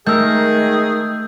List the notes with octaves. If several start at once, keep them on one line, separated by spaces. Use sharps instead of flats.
D#3 A3 G#4 A#4 E6 G6